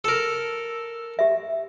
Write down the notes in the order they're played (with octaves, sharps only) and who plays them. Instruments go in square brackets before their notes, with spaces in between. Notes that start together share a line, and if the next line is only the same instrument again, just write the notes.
[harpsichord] A4 A#4
[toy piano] G4 E5